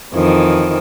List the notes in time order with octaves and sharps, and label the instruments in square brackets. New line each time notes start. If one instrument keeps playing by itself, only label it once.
[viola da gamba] F2 D#3 E3